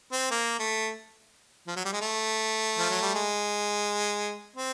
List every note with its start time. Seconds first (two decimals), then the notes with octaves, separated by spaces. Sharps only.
0.12 C4
0.31 A#3
0.59 A3
1.68 F3
1.76 F#3
1.85 G3
1.93 G#3
2.01 A3
2.78 F3
2.90 F#3
3.02 G3
3.14 G#3
4.56 C4